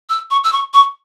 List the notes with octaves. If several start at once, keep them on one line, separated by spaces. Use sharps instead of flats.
E6
C#6
E6
C#6
C#6